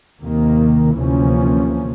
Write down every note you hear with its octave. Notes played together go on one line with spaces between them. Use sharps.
D#2 C3 D#3 A#3
D2 C3 E3 F3 A#3 C#4